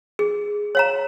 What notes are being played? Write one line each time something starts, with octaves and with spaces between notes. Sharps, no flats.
G#4
C#5 F5 A#5